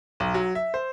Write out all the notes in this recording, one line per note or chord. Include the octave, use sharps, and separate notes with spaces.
B1
F#3
E5
C5